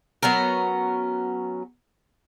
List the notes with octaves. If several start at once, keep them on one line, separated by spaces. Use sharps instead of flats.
F#3 B3 C#4 A#4